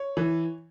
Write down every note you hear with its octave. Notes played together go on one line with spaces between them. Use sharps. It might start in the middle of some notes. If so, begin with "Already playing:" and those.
Already playing: C#5
E3